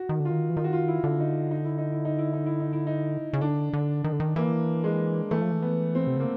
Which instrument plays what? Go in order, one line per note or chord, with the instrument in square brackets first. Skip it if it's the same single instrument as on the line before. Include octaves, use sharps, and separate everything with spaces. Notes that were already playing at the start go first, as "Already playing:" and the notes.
Already playing: [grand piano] F#4
[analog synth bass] D#3
D3
[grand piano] F4
[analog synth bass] D#3
E3
[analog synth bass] D#3 [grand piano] F4
[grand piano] F#4
F4
E4
[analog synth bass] D3
[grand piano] D#4
D#4
E4
D#4
E4
D#4
E4
D#4
E4
D#4
E4
D#4
[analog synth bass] C#3
[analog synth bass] D3 [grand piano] D4
[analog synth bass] D3
D#3
D3
D#3
[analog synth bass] E3 [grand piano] A#3
[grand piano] G#3
[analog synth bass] E3 [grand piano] A3
[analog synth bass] F3
E3
[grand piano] B3
C4
[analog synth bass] C3
[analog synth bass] C#3 [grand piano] A#3